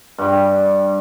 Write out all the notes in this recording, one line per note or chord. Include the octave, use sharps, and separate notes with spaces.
G2 G3